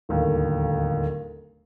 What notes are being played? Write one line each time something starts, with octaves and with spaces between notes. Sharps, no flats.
D1 G1 D#2